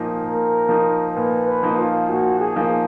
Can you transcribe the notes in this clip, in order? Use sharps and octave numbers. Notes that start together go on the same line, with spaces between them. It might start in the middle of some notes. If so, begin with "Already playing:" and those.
Already playing: A#2 F3 A#3 D#4
A#2 A#4
F3 A#3 D#4
A#2 B4
B4
F3 A#3 D#4
F4
A#2 F#4
G#4
F3 A#3 D#4